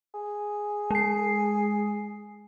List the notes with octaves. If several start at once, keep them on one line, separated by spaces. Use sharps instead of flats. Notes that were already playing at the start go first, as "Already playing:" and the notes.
G#4
G#3 C7